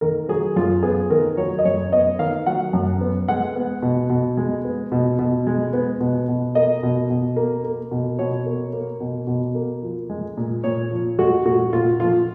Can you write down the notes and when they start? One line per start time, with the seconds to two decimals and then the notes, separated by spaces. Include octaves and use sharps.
0.01 D#3 A#4
0.29 F#3 G#4
0.56 F#2 F4
0.83 B3 G#4
1.10 D#3 A#4
1.37 F#3 C#5
1.59 D#5
1.65 F#2 C#5
1.92 B3 D#5
2.19 D#3 F5
2.46 F#3 F#5
2.73 F#2
3.01 B3
3.28 G#3 F#5
3.56 B3
3.82 B2
4.10 B2
4.37 G#3
4.64 B3
4.92 B2
5.19 B2
5.47 G#3
5.73 B3
6.01 B2
6.28 B2
6.55 A#3 D#5
6.83 B2
7.10 B2
7.36 A#3
7.64 A#3
7.91 B2
8.19 B2 C#5
8.46 A#3
8.73 A#3
9.00 B2
9.27 B2
9.55 A#3
9.82 F3
10.10 G#3
10.37 A#2
10.64 A#2 C#5
10.91 F3
11.19 G#3 F#4
11.46 A#2 F#4
11.73 A#2 F4
12.00 F3 F4